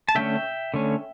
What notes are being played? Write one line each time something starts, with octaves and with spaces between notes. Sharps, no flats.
A5
D3 A3 C#4 E5 G5
D3 A3 C#4